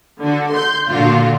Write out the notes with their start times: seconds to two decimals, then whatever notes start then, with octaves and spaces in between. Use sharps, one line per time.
0.20 D3 F#4
0.51 C6 G6
0.90 A#2 D3 F4 F#4